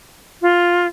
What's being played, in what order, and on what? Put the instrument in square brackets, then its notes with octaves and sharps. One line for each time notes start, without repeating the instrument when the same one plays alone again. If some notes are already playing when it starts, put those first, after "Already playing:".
[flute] F4